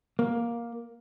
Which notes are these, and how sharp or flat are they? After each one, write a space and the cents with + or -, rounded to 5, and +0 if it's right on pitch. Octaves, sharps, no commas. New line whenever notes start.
A#3 +10